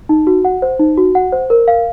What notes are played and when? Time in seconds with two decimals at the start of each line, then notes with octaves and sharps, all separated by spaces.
0.09 D#4
0.27 F#4
0.45 F#5
0.62 C5
0.80 D#4
0.97 F#4
1.15 F#5
1.32 C5
1.50 A#4
1.68 F5